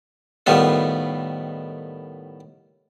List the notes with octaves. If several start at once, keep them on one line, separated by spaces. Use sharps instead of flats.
A2 D#3 G3 B3 F4